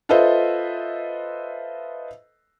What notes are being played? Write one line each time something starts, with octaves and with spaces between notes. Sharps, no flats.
F4 A4 B4 C5 D#5 E5